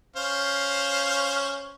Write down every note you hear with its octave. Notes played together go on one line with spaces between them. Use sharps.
C#4 C5 F5